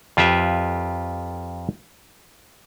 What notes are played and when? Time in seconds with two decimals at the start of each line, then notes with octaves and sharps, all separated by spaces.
0.17 F2 F4 G4 B4 E5